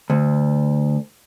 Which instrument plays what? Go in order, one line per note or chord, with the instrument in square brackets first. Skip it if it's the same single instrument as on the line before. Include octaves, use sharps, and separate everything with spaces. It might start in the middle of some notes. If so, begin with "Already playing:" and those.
[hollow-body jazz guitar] D2